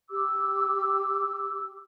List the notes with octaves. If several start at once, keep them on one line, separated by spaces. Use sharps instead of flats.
G4 D6 E6